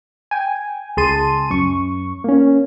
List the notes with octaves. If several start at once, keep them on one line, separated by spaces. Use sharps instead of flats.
G5 G#5
C#2 G#4 A5 C6 D#7
F#2 C#6
A#3 C#4